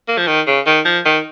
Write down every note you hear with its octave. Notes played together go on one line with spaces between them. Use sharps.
A#3
F3
D#3
C#3
D#3
F3
D#3